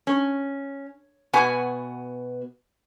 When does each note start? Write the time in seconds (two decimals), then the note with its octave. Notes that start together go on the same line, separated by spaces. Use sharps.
0.07 C#4
1.33 B2 B3 F#4 G#5